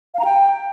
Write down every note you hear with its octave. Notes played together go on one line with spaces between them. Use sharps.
F5
A#5
G5